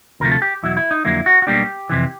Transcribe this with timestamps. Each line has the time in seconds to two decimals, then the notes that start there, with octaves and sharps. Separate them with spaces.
0.20 D2 C3 F3 A3 A#4
0.32 A4
0.42 G4
0.63 E2 B2 F#3 E4
0.77 E4
0.91 D#4
1.05 F2 D3 F#3 A#3 E4
1.26 F#4
1.42 F#4
1.47 B1 B2 G3 A#3 D4 G4
1.90 F2 C3 E3